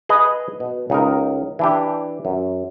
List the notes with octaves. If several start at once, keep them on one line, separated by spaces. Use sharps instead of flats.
G#4 B4 D#5
B2
C#2 D#4 A#4
E3 D4 G4
F#2